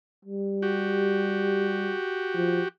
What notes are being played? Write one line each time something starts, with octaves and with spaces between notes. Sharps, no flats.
G3
F#4 G4
F3